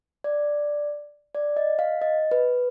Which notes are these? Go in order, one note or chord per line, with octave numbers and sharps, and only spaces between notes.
D5
D5
D#5
F5
D#5
B4